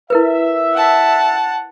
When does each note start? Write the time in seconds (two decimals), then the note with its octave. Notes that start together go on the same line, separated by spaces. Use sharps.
0.10 E4 A#4 B4 E5
0.74 F#5 A5